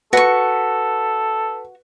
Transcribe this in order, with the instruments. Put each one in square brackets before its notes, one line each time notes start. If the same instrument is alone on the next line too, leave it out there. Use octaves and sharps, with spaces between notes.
[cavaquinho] F#4 C#6 [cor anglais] A4 [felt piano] B4